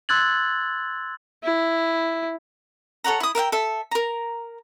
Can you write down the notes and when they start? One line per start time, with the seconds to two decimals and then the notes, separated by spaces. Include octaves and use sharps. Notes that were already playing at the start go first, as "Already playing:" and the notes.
0.09 C6 E6 F#6 G#6 A6 F#7
1.44 E4
3.04 A4 C#5 F#5 A#5
3.20 E4 D#6
3.35 A#4 E5 F5 G5
3.52 A4 E5
3.91 A#4 A#5